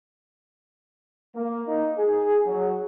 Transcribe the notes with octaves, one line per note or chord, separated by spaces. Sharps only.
A#3
D#4
G#4
F#3